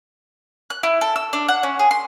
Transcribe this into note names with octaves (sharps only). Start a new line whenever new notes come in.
F#6
E4
A4
E6
D4
F#5
C#4
G#4
C6